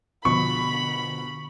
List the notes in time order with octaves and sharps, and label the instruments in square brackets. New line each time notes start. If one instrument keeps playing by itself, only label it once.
[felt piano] B2 F3 [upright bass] D3 [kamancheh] B5 [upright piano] C#6